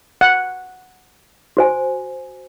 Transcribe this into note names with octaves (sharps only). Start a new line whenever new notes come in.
F#5
F#4 C5 G#5